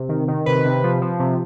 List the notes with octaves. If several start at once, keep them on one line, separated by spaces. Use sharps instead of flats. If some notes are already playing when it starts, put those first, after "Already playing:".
Already playing: C3
D#3
D#3
C3 B4
C3
F3
F3
C3